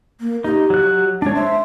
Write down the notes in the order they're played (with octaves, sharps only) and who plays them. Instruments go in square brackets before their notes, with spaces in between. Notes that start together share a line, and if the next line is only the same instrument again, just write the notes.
[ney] A#3
[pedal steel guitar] D#4 [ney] G4
[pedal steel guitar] F#3 F#6
[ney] G#3 [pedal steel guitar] D4 C#5
[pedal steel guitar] C5 [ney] E5